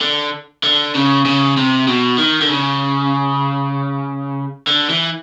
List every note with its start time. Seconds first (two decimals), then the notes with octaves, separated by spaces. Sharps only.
0.01 D3
0.63 D3
0.95 C#3
1.25 C#3
1.57 C3
1.88 B2
2.18 D#3
2.41 D3
2.49 C#3
4.67 D3
4.90 E3